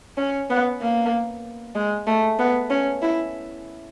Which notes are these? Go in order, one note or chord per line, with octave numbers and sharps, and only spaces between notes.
C#4
B3
A#3
G#3
A3
B3
C#4
E4